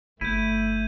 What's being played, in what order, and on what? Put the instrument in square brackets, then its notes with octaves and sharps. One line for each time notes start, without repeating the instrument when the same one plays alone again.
[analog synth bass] G1 [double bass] A3 [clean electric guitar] E4 [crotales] G6 D#7